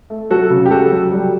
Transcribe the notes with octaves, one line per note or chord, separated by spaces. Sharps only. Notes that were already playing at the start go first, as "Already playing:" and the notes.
A3
F#3 F#4 A4
C#3
G4
F#3 F#4 A4
F#3
G3